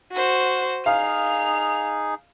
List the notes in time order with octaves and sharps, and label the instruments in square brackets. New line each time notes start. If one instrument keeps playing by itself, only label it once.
[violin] F#4 C5
[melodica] D#4 G#4 [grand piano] F5 [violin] F7